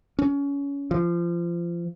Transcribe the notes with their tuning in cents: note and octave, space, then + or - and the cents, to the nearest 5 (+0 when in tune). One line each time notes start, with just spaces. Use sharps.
C#4 +25
F3 -25